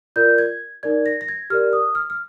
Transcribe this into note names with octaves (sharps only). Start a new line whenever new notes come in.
F4 A#4 D5 G6
G#6
D#4 A#4 D5 G#6
A#6
A#6
G#6
G4 A#4 D5 F6
D#6
F6
F6